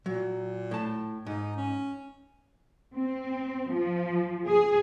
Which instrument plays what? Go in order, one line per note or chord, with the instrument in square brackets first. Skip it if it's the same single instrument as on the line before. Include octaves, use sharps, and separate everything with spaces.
[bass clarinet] A#2 [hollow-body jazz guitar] F#3
[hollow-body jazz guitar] A2 A5
[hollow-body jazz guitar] G#2 [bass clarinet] D#4
[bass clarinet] C#4
[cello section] C4
F3
G#4